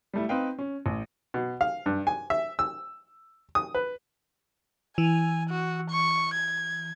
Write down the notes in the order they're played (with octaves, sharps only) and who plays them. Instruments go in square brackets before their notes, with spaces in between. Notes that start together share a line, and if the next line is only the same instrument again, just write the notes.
[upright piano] G3 A3 E4
C4 D#4 B4 F5 G5
C#4
A1
[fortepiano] B2
F5
G2
G#5
E5
E6
D#6
B4
[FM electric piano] E3 [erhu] G#5
[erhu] F#4
C#6
G#6